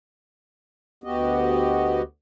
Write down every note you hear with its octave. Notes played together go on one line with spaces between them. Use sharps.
D2 B3 F#4 G4 D#5